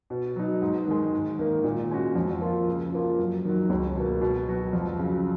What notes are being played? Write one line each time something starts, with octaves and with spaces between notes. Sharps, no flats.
B2
F#3 B3 D#4
G#2
D#3 G#3
G#2
D#3 A#3
A#2
G#3 C#4 F#4
F2
F3 A#3 F4
C#3
F3 A#3 F4
F#2
D#3 F#3
C#2
B2 A#3
B2
F#3 B3 F#4
F2
C#3 F#3